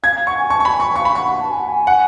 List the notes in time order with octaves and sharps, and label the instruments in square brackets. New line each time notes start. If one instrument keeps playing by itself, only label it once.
[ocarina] F5 [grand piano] G#6
[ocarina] F5
[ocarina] F#5 [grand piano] C#6
[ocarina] G#5
[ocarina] A5 [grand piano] C#6
[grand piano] C#6
[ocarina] A5 [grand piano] B5
[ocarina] G#5
[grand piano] C#6
[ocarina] F5 [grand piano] C#6
[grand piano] B5
[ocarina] F#5 [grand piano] C#6
[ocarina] A5
G#5
F#5
G#5
[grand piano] F#5